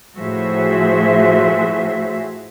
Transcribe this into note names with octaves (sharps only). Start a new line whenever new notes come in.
A2 F3 F#4 G#4 C5 E5